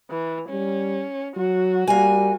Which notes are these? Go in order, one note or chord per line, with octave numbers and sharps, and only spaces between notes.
E3
G3 C#4
F#3 F#4
G3 A#3 G#5